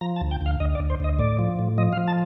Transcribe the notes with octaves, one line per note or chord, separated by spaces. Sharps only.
F3 A#5
A5
D2
G5
D2 F5
D2 D#5
D5
D2
C5
D2 D#5
A2 D5
F3
A2
F3 D#5
F5
F3
A5